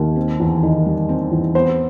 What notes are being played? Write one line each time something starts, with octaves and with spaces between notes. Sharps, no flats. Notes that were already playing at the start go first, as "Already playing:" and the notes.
Already playing: D#2
C4
E2
D#3
G3
C4
E2
B3 C5